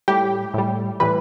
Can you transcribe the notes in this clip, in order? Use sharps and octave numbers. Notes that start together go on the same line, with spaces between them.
A2 G3 G4
A2 G3
A2 E3 G3 B4